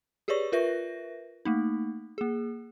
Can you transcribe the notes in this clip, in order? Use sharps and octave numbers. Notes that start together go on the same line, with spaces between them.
G4 G#4 B4 C#5 D5 C#6
F4 A#4 B4 E5 A#6
A3 A#3 D#4
A#3 G#4